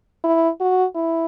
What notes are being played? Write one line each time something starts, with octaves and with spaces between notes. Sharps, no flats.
E4
F#4
E4